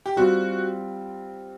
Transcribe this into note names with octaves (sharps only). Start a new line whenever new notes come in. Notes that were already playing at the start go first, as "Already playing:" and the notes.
G4
G3 C4 F4 F#4